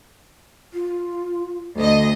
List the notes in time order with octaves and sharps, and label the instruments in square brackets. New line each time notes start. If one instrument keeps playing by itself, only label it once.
[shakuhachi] F4
[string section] D2 D#5 [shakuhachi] A4